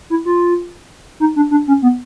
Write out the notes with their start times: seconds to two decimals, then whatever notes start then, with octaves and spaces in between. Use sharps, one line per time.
0.10 E4
0.25 F4
1.20 D#4
1.36 D4
1.51 D4
1.68 C#4
1.82 B3